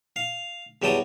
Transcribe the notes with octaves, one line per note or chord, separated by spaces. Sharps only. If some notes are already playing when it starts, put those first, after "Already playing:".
F5
E2 F#3 G3 G5 A5 D#6